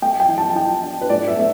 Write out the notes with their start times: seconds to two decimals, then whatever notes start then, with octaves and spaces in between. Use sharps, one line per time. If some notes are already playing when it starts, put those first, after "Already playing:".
0.02 A3 G5
0.20 G5
0.28 E3
0.38 A5
0.55 E3 G5
0.83 D4
1.01 B4
1.09 A2 D5
1.28 E5
1.37 A3